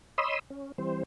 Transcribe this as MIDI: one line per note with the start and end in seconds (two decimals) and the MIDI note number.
0.18 0.39 73
0.18 0.39 75
0.18 0.39 83
0.18 0.39 84
0.18 0.39 87
0.18 0.39 88
0.50 0.72 61
0.78 1.03 52
0.78 1.03 55
0.78 1.03 60
0.78 1.03 72